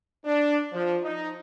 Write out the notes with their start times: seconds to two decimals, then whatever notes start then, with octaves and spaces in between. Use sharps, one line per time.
0.25 D4
0.72 F3
1.03 D#4